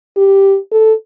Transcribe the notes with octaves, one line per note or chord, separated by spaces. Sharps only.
G4
A4